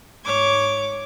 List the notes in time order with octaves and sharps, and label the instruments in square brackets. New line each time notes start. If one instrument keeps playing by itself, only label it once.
[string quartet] G#2 C#5 D6 G#6